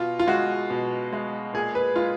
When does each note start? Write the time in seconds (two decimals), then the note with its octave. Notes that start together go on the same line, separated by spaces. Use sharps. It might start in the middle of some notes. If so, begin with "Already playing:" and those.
Already playing: B2 F4
0.19 F4
0.27 G#3 F#4
0.70 B2
1.13 G#3
1.54 A#2 G#4
1.75 B4
1.96 G#3 F4